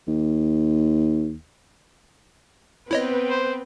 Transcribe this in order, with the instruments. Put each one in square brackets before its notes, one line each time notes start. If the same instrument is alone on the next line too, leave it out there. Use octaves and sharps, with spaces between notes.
[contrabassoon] D#2
[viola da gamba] B3 C4 [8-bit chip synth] E4 C#5 D#5 [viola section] B4 G5
[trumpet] C5